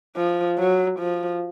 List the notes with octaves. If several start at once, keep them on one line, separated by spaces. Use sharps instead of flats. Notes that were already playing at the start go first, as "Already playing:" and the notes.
F3
F#3
F3